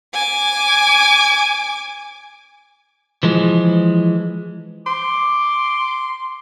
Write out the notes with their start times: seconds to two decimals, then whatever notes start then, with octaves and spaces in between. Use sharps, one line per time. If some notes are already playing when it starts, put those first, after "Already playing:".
0.14 G#5 D6
3.23 E3 F3 G#3
4.86 C6 D6